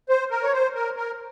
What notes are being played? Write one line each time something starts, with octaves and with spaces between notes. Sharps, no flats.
C5
A#4
C#5
C5
A#4
A#4